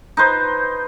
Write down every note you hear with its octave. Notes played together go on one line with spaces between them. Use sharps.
D#4 B4 C5